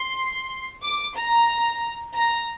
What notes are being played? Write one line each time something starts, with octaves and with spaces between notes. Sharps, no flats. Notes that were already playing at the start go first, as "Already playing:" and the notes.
Already playing: C6
D6
A#5
A#5